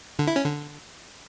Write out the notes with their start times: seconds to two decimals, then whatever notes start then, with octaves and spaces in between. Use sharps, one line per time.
0.19 D3
0.27 E4
0.36 C#4
0.44 D3